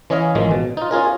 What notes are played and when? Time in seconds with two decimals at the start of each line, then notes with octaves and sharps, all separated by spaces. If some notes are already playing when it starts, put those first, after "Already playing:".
0.10 E3 C#4 C#5 D#5 F5
0.35 A1 D#3 F3 G#3
0.51 B2
0.77 D#4 F4
0.91 C#4 F4 G#4 A#4